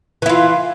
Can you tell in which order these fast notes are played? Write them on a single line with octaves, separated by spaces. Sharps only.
E3 E4 F4